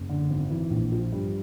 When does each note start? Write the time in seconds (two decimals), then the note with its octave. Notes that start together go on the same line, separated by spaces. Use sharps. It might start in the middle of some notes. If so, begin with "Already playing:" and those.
Already playing: F#1
0.09 D3
0.30 G#1
0.50 E3
0.70 A#1
0.92 F3
1.12 G2